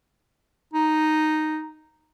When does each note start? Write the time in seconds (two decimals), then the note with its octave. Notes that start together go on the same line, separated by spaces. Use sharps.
0.73 D#4